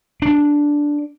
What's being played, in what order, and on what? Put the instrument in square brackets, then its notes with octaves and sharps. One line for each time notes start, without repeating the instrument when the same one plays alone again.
[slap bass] D4